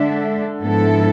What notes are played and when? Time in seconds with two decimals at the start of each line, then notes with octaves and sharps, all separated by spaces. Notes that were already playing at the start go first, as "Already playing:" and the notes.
Already playing: D3 G#3 D4 A4 E5
0.60 G#2 F3 B3 E4 A4